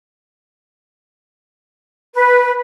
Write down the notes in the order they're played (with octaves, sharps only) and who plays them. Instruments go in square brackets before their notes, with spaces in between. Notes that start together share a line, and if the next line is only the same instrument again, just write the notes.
[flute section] B4